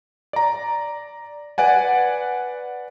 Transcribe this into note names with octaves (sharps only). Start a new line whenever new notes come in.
D5 A#5
B4 D5 F#5 G#5